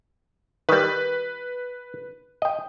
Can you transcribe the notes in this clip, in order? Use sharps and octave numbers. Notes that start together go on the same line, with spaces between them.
D#3 G3 B4
D#5 G5